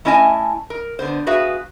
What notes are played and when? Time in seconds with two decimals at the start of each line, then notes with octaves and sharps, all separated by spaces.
0.05 A3 C#4 E4 D#5 G#5 A5
0.70 A#4
0.99 D3 B3 C5
1.27 F#4 G#4 B4 E5 F5